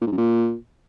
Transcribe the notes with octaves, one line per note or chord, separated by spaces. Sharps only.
A#2
G#2
F#2
A#2